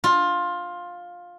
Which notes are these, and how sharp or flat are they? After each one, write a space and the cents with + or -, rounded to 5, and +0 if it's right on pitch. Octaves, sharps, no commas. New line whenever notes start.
F4 +15